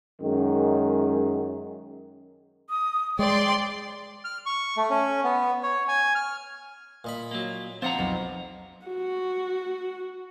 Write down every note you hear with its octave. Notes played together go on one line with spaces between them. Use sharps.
F#2 D#3 G#3
D#6
G#3 D5 G5 C6
F6
C#6
A3
C#4
B3
C#5
G#5
F6
A#2 D#5 B5
F#3 A#3
F3 C4 F#5 A#5 A6 C7
B1 F2
F#4